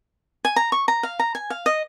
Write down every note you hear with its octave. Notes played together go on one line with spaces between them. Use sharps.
G#5
A#5
C#6
A#5
F5
A#5
G#5
F5
D#5